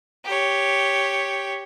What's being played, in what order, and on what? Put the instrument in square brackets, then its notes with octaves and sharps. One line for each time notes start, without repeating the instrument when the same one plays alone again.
[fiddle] G4 C#5